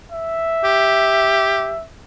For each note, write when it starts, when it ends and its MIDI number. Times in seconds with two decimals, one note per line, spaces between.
0.12 1.84 76
0.64 1.73 67